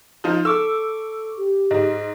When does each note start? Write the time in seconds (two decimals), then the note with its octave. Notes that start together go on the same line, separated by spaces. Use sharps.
0.24 F3 D#4 F4
0.45 A4 C#6 D6 E6
1.38 G4
1.71 G#2 D#5